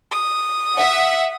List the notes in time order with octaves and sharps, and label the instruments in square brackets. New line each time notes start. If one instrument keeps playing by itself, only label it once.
[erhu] D#6
[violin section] E5 F#5